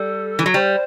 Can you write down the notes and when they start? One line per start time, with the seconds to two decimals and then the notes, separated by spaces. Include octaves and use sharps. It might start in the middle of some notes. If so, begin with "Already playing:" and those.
Already playing: G3 A4
0.39 E3
0.46 F#3
0.54 G3 C5